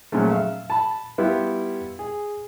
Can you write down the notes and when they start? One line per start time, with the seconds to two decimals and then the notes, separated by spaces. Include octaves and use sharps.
0.12 A#2 C#3 F3 F#3 A3
0.29 E5 F5
0.70 A5 B5
1.18 G3 B3 E4 F4 G4
1.99 G#4